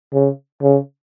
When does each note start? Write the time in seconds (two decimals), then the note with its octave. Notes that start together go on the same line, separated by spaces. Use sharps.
0.13 C#3
0.62 C#3